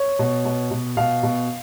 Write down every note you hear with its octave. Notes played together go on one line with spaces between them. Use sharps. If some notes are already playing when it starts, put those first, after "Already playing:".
Already playing: C#5
B2
B2
B2
B2 F5
B2